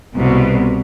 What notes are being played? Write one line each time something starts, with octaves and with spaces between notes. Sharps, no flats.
C2 B2